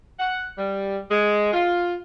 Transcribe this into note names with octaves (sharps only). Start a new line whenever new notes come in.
F#5
G3
G#3
F4